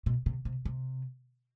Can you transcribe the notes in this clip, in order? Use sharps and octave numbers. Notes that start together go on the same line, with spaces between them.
B2
C3
C3
C3